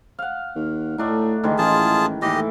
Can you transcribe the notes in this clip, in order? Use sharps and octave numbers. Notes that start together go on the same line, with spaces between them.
F5 F#5
D#2
A2 A3 D4 D#4
D2 D#3 E3 G#3
A1 F4 G#4 A5
D#2 A2 E3 G4 D#5